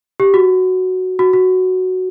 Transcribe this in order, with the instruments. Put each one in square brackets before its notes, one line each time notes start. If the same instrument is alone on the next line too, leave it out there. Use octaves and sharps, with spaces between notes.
[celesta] G4
F#4
F#4
F#4